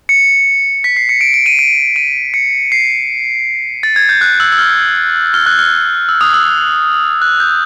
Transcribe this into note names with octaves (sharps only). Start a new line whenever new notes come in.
C#7
B6
C7
C#7
D7
D7
D#7
D7
D#7
C#7
C7
A6
G#6
G6
F#6
E6
E6
F6
F6
F#6
F6
E6
D#6
E6
F#6
G6